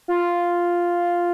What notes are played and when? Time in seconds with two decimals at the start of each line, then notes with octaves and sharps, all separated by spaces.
0.08 F4